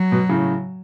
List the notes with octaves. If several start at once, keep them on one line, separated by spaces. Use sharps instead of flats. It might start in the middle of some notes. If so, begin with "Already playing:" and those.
Already playing: F#3
B2
A2 C#3